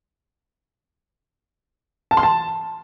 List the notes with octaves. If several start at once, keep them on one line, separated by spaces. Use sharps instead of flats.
A5
C6
A5